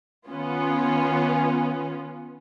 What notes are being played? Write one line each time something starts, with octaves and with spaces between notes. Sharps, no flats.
D#3 B3 C#4 F4